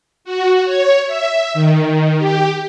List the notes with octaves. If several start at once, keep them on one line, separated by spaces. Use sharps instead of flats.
F#4
C#5
E5
D#3
G4